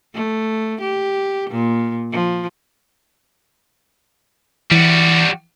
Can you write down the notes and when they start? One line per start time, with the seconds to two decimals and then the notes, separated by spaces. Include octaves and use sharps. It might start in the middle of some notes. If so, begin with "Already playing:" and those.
0.14 A3
0.81 G4
1.50 A#2
2.12 F3
4.72 E3 G3 F#4